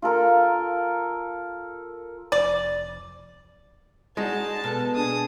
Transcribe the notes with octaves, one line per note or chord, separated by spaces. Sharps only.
F4 A4 A#4
F1 D5
G#3 D#4 F#4 A5
B2 B3 A4
D4 G#4 A5 D#6